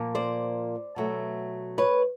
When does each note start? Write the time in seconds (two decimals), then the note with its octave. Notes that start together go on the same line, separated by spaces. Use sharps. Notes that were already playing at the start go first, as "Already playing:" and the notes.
Already playing: A#2 F3 A#3
0.15 C5 D5
0.96 B2 F#3 A3
1.78 B4 C#5